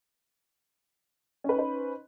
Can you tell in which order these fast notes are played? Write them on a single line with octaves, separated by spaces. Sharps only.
C#4 B4 D#4 C5